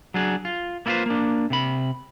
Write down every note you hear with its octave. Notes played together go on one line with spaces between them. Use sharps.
F#3 D4 G#4
F4
A#3 E4 F4 A4 B4 C5
A#3 D4
C3 B5